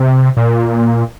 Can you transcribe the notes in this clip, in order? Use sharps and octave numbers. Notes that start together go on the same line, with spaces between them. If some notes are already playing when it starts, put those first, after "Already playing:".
Already playing: C3
A#2